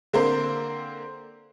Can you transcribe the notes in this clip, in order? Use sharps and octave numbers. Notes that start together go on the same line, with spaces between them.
D3 A#3 C4 A#4 C5